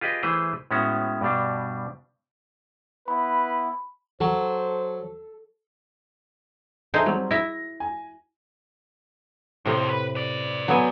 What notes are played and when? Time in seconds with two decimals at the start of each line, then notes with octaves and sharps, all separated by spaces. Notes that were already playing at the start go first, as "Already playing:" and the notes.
0.01 F4 G4 G#4 B4 D#5
0.23 E3 A3 G#4 B4 C5
0.71 A2 G#3 B3 C#4 F#4
1.21 G2 B2 G3 D4
3.08 B3 E4 B4 B5
4.21 F#3 A4 C5
6.94 D#4 G#4 A4 C5 E5 A#5
7.06 F#3 G3 C4
7.31 E4 E5 A#6
7.80 G#5
9.66 F2 A2 C3 F3
9.89 B4
10.15 B4 D5
10.68 F#3 B3 G#5